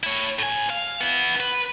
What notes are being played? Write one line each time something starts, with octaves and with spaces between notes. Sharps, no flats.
E4 C#5
A2 G#5
F5
B3 E4
B4